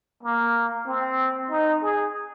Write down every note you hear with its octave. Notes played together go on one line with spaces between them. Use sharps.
A#3
C4
D#4
G#4